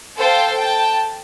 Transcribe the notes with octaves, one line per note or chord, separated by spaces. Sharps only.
A4 C5 F5 G5 A5
G5 A5